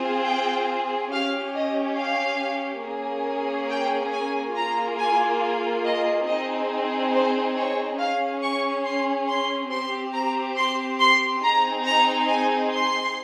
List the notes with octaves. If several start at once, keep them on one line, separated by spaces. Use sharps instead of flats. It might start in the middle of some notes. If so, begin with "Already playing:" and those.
Already playing: C4 F4 G#4
G5
C#4 G4 F5
D#5
F5
A#3 C#4 G#4
G5
G#5
A#3 F4 G#4 A#5
G#5
D#5
C4 D#4 G#4 D#5
C5
C#5
C#4 G#4 F5
C#6
C6
C6
C4 G4 C6
A#5
C6
C6
C4 D#4 G#4 A#5
A#5
G#5
C6